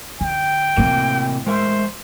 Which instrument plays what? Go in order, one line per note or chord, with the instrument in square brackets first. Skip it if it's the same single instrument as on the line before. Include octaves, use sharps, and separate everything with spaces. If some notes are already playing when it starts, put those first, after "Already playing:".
[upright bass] D3 [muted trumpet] G5
[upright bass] A2 E3 [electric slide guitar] C3 A#3
[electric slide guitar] G#3 A#4 E5 [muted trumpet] C5